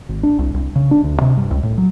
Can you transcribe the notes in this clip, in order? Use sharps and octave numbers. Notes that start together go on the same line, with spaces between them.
G#1
D4
C2
C2
C#3
D4
D2
C3
G2
C#2
A2
F#3